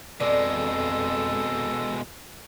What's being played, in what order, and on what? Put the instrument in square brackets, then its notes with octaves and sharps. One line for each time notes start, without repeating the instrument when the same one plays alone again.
[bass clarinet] F2 [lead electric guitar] B2 G#3 [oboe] A4 [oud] D5